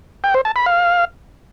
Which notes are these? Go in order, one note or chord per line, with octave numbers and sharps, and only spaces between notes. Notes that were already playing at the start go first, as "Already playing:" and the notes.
G5
C5
A5
B5
F5